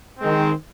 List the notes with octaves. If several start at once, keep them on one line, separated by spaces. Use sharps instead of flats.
D#3 G#3 C4